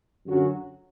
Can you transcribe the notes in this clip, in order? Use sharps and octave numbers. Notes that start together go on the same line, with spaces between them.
F#2 D3 F#3 C#4 F#4